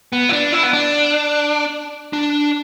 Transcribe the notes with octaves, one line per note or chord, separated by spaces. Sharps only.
B3
E4
D4
E4
B3
D4
D4